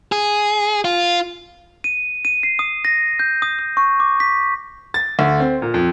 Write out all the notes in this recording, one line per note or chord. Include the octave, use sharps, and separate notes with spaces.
G#4
F4
D#7
D#7
C7
D#6
A#6
G6
D#6
D#6
C#6
D6
B6
A6
D2
C4
A#2
F2